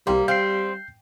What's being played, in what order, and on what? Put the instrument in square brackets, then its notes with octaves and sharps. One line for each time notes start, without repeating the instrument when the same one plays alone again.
[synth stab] C2 G4 C5 [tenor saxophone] G3 [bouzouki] A#3
[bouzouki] C4 [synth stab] F5 [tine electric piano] G6 C7